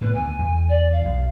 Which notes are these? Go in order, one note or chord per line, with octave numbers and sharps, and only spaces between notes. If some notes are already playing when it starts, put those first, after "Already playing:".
A2 B3 B4
D2 G#5
E2
D5
F5
B1